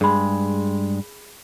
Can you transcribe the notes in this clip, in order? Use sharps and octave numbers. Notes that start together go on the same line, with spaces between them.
G2 G#3 G#4 B5